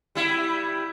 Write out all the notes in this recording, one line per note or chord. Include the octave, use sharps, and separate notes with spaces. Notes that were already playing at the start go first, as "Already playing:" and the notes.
G3 E4